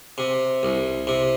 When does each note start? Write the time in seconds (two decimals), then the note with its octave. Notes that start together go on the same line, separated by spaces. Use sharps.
0.18 C3
0.63 C2
1.07 C3